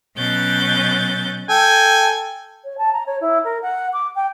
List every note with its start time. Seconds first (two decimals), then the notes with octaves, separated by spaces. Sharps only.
0.17 B2 F#3 C#4 F#6 G6 A6
1.49 A4 G5 G#5
2.64 C#5
2.77 A5
2.92 A#5
3.06 C#5
3.21 E4
3.44 A#4
3.62 F#5
3.93 D6
4.15 G5